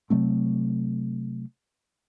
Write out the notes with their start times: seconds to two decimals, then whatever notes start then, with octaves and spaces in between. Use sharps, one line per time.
0.10 C3 F#3 A3 C4